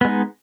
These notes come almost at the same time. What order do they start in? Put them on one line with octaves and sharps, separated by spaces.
B3 G#3 D#4